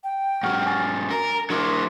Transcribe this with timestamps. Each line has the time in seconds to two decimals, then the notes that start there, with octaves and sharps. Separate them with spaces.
0.04 G5
0.43 G#2 F#3 F#5 C#6 F6
0.67 G#5 D6 A6
1.10 A#4 A#5
1.50 F#3 D4 E4 A#4 C6 D6